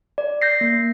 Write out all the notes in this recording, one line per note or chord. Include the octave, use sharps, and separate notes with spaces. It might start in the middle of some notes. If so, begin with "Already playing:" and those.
D5
G6 A#6 C7
A#3